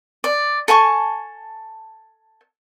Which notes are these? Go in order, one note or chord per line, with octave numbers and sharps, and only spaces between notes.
D5
A4 G#5 A5 C#6